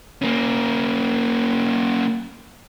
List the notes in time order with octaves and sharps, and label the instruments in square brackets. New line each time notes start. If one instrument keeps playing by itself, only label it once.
[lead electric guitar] A#3 C#4